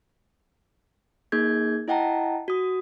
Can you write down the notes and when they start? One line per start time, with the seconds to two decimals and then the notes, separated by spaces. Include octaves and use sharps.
1.32 A#3 D#4 G#4 G6 G#6
1.88 E4 D#5 F#5 G5 A5 A#5
2.48 F#4 D#6